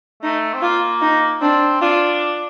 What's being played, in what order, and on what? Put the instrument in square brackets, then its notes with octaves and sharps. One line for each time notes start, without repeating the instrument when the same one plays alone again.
[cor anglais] A3 [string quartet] D#4
[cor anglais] C4
[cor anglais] A#3 [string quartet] F4
[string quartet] D#4
[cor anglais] C4 [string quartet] D4
[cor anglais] D4 [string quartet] F4